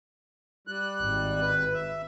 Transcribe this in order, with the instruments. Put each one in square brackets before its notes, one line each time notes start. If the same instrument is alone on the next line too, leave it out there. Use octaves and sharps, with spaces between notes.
[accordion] G3 F#6
[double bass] G#1
[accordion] B4
E5